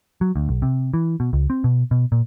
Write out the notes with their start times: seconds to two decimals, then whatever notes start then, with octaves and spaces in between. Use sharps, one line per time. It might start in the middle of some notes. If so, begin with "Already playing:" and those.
0.21 F#3
0.36 D2
0.49 B1
0.62 C3
0.94 E3
1.20 B2
1.33 C#2
1.50 C4
1.64 B2
1.91 B2
2.12 A#2